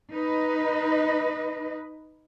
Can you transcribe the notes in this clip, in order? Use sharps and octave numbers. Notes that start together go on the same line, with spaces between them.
D#4 B4 D#5